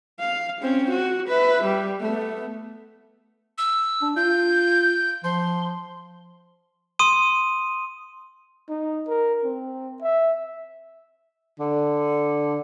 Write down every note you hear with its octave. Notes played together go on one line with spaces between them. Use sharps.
F5
C4 C#4
F#4
B4 E5
G3
A3 B3
E6
D4
F4 G6
F3 C6
C6 D#6 D#7
D#4
A#4
C4
E5
D3